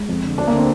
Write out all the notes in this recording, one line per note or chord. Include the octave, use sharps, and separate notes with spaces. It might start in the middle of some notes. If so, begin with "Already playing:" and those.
Already playing: G#3
F2
D3
D2 D4
A#3
D3
C4